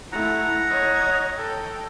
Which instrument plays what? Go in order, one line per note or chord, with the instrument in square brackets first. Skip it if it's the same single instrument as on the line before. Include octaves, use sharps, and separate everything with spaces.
[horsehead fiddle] A3 E4 [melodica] F#5 A#5
[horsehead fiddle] C#5 D#5
A4 G5